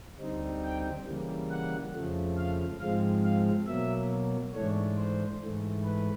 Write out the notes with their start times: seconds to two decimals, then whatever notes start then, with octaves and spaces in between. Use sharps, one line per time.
0.20 D2 D3 G3 C4 D#4
0.64 G5
1.07 C#3 E3 G3 A#3
1.50 F#5
1.94 F2 C#3 F3 A3
2.37 F5
2.80 G#2 F3 G#3 C4 F5
3.24 F5
3.67 B2 F#3 A#3 E5
4.54 G#2 E3 A3 D4 C#5
4.97 C5
5.40 G#2 E3 A3
5.84 B4